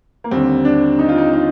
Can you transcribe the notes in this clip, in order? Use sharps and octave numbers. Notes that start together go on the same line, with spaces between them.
A#3
D#2 D3 G3 C4
D4
D#4
F4
D#4
D#4